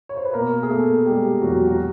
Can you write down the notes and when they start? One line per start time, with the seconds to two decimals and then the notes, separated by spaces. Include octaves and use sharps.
0.09 C#5
0.17 C5
0.25 B4
0.34 B2 A#3 A#4
0.63 G#4
0.70 A3 B3 A4
1.06 G3 G#3 G4
1.41 E2 F#3 F#4
1.67 F#4